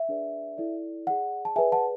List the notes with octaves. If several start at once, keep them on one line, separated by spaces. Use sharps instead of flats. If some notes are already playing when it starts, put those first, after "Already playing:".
Already playing: E5
D4 G#4 B4 D5
E4 A4 D5
G#4 D5 F#5
A5
G#4 B4 D5 E5 G#5
F#5 A5